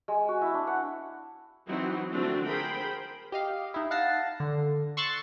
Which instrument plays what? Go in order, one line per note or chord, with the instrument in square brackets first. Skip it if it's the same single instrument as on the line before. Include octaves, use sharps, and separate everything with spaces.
[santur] G#3
F#4
E4
D4
F#5
[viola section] E3 F#3 C4 D#4 E4 F#4
D3 F3 A3 C4 D4 F#4
G#4 A#4 C5 G5 B5
[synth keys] G4 D#5 F5
D#4 E4
F5 F#5 A5 A#6 C7
D3
C6 C#6 E6 F#6 A6 C7